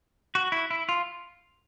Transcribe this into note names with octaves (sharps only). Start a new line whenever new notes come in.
F#4
E4
E4
F4